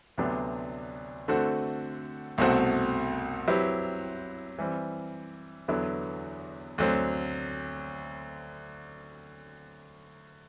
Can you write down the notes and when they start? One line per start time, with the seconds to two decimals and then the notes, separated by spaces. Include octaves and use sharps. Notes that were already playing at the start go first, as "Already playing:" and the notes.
0.18 D2 C3 F#3 B3 D4
1.28 D3 A3 C4 F#4
2.38 C2 B2 A3 C4 F#4
3.48 F#3 C4 E4 G4 B4
4.58 E3 G3 C4
5.68 E2 D3 F#3 B3 E4
6.78 D2 D3 F#3 C4